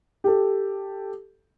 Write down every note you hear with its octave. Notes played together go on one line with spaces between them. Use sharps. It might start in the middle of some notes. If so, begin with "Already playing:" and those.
G4 A4